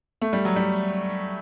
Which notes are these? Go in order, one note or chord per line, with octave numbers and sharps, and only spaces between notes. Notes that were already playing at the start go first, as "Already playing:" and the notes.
A3
G3
F#3
G3